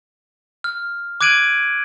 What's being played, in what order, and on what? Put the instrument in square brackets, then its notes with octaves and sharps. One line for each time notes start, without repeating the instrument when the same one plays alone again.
[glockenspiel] F6
D6 F#6 G#6 D7 D#7 F#7